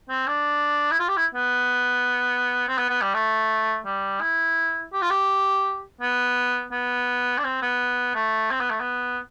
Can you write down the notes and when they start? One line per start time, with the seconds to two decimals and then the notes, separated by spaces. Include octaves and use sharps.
0.10 C4
0.27 D4
0.92 E4
0.99 F4
1.08 G4
1.17 E4
1.35 B3
2.68 C4
2.78 B3
2.89 B3
3.02 G3
3.14 A3
3.86 G3
4.21 E4
4.93 G4
5.02 F4
5.10 G4
6.01 B3
6.72 B3
7.38 D4
7.44 C4
7.62 B3
8.15 A3
8.51 C4
8.60 B3
8.70 A3
8.80 B3